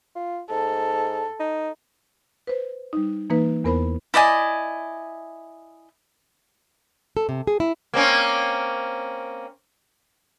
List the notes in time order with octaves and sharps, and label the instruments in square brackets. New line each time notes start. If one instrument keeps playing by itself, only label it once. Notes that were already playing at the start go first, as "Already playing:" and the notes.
[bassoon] F4
[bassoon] G#2 [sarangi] A4
[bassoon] D#4
[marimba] B4 C5
G3 D#4
E3 A#3 D#4 B4
E2 B3 A#4 C5 B5
[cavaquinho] E4 D5 D#5 G#5
[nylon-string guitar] A4
C3
G#4
E4
[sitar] A#3 C4 C#4